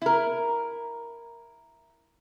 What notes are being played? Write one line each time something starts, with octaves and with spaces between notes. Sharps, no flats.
E4 A#4